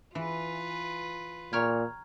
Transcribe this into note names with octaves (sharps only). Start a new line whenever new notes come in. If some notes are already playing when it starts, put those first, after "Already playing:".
E3 F4 B4
A#2 C#5 G5 A#5 F6 G#6